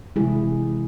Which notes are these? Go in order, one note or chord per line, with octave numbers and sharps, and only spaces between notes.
C3 E3 G#3 E4 G#4